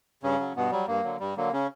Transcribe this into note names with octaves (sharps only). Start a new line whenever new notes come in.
G2 C#3 C#4
F#3
G2 B2 B3
F#3 G3
G2 A#3
D3 F#3
G2 G3
D3 F#3 A#3
C#3 C#4